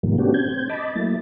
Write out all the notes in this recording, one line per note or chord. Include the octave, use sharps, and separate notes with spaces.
G#2 B2 D#3 F3 G3 A#3
A3 B3 C#4 D4 F#4 G4
C4 G6 G#6
D#5 A5 B5 D6
F#3 A3 A#3 E4 A6